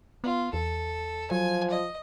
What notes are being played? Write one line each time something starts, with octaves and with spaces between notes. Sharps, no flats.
B3 F4
E2 A4
F3 F#3 G#5
D#5